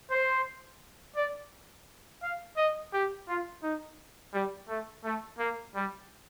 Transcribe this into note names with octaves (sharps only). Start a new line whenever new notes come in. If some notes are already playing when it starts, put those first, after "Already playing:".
C5
D5
F5
D#5
G4
F4
D#4
G3
A3
A3
A#3
G3